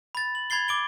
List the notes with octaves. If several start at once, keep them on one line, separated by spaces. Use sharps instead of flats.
B5 A6
F#7
B5 G#6 A6 C7 G7
D6 D7 G7